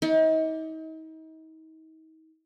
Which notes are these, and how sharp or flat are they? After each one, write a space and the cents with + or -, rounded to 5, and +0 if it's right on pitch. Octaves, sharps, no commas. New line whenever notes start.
D#4 +40 D5 +0